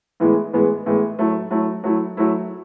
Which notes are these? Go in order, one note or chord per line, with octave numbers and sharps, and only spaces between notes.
A2 E3 G#3 B3
A2 E3 G#3 B3
A2 E3 G#3 B3
F#3 A3 E4
F#3 A3 E4
F#3 A3 E4
F#3 A3 E4